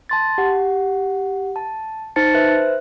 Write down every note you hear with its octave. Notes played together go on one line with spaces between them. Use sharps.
A5 C6 A6
G4 F#5
A5
D#4 C5 A5 A6 C#7
B4 C5 E5 F#6